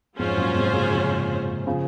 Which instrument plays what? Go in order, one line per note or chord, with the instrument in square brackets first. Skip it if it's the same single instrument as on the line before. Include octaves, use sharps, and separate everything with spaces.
[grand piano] F2 G#2 [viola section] F#3 C#4 F4 G#4 C5
[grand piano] F#2 A#2
G#2 C3
A#2 C#3
C#3 F3
C#3 F3